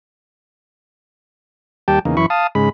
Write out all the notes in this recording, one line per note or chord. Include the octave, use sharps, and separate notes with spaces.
D#2 G3 G4 G5 A5
E2 C#3 A#3 D#4
F#2 E3 E4 B5 C#6
F5 A5 D#6
G#2 C#3 G#3 B5